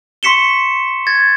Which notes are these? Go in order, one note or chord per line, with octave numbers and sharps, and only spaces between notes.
C6 C#6 B6 C#7 E7 G7
G#6 A6